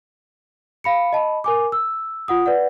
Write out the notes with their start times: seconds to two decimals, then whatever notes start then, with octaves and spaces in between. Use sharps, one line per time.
0.84 F5 B5 C#7
1.13 D#5 A5 B5
1.44 A#4 G#5 D6
1.72 E6
2.28 F4 F#5 D#6
2.46 B4 D5 F#5